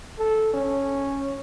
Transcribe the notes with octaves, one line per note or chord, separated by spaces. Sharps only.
A4
C#4